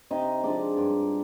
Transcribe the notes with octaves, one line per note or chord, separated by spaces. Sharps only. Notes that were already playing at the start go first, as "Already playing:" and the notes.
C3 D#4 D#5
F3 G#3 D4 D5
G2